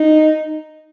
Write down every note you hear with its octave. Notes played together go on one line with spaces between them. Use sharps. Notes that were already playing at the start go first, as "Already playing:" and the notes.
Already playing: D#4